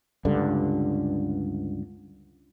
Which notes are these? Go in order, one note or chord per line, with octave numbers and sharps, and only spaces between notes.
C#2 G2 D3